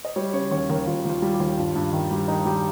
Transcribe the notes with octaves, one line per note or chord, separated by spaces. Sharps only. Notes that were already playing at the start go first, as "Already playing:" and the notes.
D#5
G3 C#5
C#3 C#5
D#2 C#5
D#2 A#4
D#2 F4
D#2 F4
G3
G4
D#2
G2 F4
G2
D#3
G3
D#3 D#4
G3